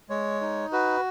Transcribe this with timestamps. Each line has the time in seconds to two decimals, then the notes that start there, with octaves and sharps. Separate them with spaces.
0.09 G#3 C#5
0.41 D#4
0.72 F#4 B4